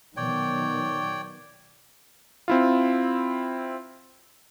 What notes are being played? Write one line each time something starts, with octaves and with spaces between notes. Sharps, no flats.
B2 D#3 F#3 C#5 D5 G5
C4 E4 F4